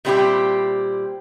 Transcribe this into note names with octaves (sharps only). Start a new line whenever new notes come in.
A#2 G3 C4 D4 E4 G4